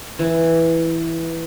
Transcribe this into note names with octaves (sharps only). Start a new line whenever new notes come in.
E3